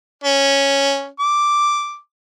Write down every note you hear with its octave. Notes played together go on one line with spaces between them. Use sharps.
C#4
D6